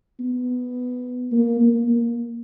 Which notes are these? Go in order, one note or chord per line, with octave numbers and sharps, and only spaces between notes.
B3
A#3
A#3
A#3